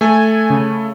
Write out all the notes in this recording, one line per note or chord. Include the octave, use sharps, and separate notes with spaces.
A3 A4 G#5
C#3